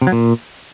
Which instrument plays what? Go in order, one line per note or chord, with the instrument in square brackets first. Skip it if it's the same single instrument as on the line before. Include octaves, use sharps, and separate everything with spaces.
[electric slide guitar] C3
F#3
A#2